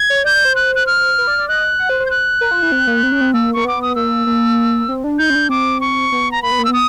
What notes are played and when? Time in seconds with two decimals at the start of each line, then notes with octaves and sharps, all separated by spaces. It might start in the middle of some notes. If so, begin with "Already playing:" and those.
Already playing: G#6
0.10 C#5
0.24 D5 G6
0.35 D5
0.45 C5
0.56 F#6
0.75 F#6
0.87 F6
1.18 B4
1.27 D5
1.38 D5
1.48 D#5 F#6
1.79 F#5
1.89 C5
2.00 C5
2.06 G6
2.10 F#6
2.41 A#4
2.51 F4
2.62 E4
2.72 C4
2.87 A#3
3.03 C4
3.12 C#4
3.21 C4
3.34 A#3 E6
3.53 A#3 C#6
3.65 B3 D6
3.82 D#6
3.95 A#3 E6
4.27 A#3
4.88 C4
5.04 D4
5.19 D#4 G6
5.30 C#4
5.35 D4
5.49 C4 D6
5.81 C#6
6.12 B3
6.32 A#5
6.43 A#3 B5
6.51 B3
6.59 A#3
6.65 B3 E6
6.73 D#6